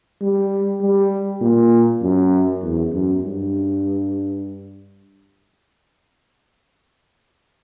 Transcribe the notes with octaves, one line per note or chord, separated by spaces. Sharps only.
G3
G3
A#2
F#2
E2
F#2
G2